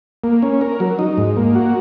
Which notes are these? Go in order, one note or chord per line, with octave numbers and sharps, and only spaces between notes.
A#3
C#4
A#4
F#3
D#4
G#2
A#3
F#4